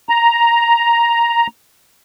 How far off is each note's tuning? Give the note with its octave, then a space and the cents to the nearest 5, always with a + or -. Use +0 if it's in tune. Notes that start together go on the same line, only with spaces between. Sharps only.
A#5 +5